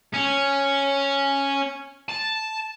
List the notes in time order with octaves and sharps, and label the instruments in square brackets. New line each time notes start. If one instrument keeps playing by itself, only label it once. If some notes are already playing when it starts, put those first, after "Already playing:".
[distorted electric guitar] C#4
A5